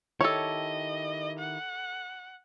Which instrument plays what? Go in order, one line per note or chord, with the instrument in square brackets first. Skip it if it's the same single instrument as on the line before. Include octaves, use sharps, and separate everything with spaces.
[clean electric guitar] D#3 E4 G4 [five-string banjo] A4 C#5 [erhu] D#5
[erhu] F#5